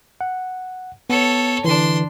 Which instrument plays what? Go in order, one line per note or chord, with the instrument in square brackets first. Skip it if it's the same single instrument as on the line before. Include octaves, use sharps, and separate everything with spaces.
[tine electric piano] F#5
[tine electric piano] B3 C#7 [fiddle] A4 C#5
[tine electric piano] D3 E3 [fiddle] D4 C6